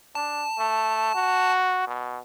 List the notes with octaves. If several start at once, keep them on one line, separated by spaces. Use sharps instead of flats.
D4 A5
A3
F#4
B2